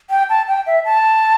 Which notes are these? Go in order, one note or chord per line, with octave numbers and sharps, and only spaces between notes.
G5
A5
G5
E5
A5